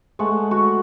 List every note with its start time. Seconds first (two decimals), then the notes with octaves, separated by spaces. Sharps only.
0.19 G#3 A3 F#5
0.51 F#4